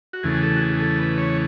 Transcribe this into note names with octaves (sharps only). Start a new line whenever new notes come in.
F#4
E2 C#3 E3 A3 G#4
A4
F#4
G#4
G#4
A4
B4
C#5